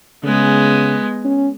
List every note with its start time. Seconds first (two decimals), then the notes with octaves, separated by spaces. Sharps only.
0.24 C#3 G#3 B3
1.25 C#4